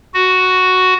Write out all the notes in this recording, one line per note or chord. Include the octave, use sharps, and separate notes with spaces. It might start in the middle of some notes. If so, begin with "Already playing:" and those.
F#4